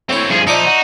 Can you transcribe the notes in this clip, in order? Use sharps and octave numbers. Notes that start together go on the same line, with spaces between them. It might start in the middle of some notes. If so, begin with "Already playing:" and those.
A3 C4 E4 C#5
G2 F3 G#4
A#2 F3 D#4 D5 E5 C#6
F#4